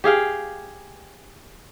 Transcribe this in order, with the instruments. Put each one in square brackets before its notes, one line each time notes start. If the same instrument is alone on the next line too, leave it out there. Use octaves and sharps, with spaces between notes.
[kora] G4 G#4 F5 G5